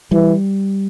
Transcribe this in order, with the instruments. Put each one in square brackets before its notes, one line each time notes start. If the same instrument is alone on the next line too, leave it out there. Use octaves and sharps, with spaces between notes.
[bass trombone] E3 [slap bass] G3